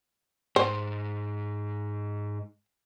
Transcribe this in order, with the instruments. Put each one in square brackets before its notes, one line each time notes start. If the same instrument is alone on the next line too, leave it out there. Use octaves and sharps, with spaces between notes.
[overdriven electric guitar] G#2 [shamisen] C5